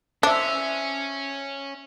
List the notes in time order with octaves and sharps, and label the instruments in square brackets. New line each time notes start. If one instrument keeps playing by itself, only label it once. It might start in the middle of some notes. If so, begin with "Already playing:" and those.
[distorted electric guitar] C#4 [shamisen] D4 [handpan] C5 E5